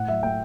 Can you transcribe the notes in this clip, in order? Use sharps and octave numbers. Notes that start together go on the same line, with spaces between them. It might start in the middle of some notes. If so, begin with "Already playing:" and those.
Already playing: A2 F#5
F#3 E5
A3 G5